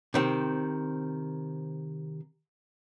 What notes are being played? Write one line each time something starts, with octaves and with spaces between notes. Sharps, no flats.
C3 D#3 C4